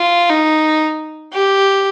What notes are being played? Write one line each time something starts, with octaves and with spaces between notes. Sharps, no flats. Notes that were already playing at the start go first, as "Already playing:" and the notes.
Already playing: F4
D#4
G4